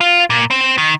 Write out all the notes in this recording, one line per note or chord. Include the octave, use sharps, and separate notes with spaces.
F4
A#2
C4
D#3